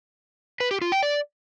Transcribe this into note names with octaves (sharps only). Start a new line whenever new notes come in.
B4
G4
F4
G5
D5